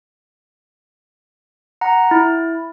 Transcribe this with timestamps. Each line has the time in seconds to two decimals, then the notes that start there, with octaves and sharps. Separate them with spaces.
1.81 F#5 A#5
2.11 E4